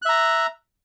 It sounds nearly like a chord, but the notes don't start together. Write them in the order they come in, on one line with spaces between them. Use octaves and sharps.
F#6 E5 A#5